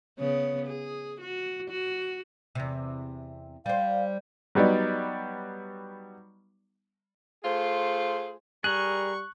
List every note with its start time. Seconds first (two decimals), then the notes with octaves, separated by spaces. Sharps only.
0.20 C#3 B3 C#5
0.67 G#4
1.21 F#4
1.70 F#4
2.55 E2 C3
3.66 G3 C5 F5
4.55 F#3 G3 B3 D#4 D5
7.44 A3 F4 G#4 C5
8.64 G3 G#4 A#4 C#6 F#6